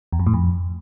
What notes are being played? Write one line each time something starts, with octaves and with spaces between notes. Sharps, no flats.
E2
F2
A2
F2